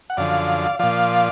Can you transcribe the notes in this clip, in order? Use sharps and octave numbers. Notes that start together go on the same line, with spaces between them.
F#5
F#2 D3 F3 D5 F5
A#2 F3 D5 F5